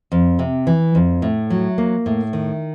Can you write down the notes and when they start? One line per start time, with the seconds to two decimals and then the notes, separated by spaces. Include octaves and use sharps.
0.12 F2
0.39 C3
0.67 E3
0.95 F2
1.22 A2
1.50 F#3
1.78 A#3
2.06 A2
2.33 D#3